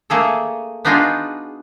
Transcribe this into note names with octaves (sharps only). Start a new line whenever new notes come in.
A3 A#3 G#4 A4
B3 D4 D#4 F4 F#4 G#4